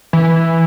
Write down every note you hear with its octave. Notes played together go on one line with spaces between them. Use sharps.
E3